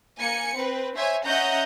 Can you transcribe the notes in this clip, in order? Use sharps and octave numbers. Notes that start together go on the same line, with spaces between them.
A#3 G#5 C#7
C4 B4
C5 C#5 E5 G#5
C#4 D#5 E5 F#5 A#5 G6